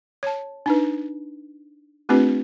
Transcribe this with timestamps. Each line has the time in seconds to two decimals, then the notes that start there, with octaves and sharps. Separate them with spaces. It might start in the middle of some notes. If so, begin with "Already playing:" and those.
0.23 C#5 A5
0.66 D4 D#4 B4
2.09 A3 C4 D4 F4 G4 B4